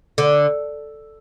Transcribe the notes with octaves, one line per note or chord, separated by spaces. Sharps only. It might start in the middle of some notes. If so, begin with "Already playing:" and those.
D3